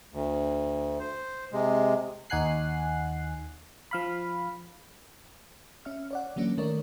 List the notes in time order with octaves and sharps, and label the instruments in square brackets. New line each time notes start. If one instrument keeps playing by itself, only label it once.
[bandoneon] D2
C5
C3 G#3
[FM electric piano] D#2 D#4 F#5 G#5 F#6 C7
F3 F5 B5
C#4 E5 F6
C#5 D5 F#5
D3 E3 F#3 A#3 C#4 D4
D#3 A3 A#4 C#5 D5